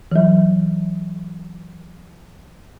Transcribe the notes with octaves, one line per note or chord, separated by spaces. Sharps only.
E3 F#3